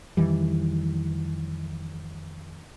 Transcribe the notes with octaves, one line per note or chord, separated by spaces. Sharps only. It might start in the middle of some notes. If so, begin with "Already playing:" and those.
F2 D#3 E3 G3